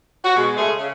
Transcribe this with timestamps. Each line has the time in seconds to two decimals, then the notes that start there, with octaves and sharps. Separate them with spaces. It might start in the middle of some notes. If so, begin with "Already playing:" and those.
0.24 F#4
0.35 B2 G#3
0.56 C#3 G#3 A3 G#4
0.78 C#3